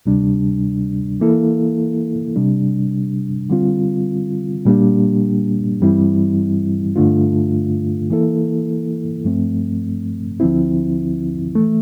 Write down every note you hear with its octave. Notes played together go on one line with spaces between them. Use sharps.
D2 C3 G3 D4
E3 A#3 E4 A4
C3 G3 D4
D3 G3 C4 F4
A#2 G3 A#3 D4 G4
G2 E3 G3 C4 E4
G2 D3 A3 D4 F4
E3 A#3 E4 A4
G2 F3 A3 C4
D2 D3 F3 C4 E4
E3 A3